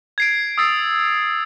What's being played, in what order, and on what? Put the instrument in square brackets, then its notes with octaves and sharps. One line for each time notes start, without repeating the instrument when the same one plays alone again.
[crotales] G#6 C7 D7
D#6 E6 A6 C7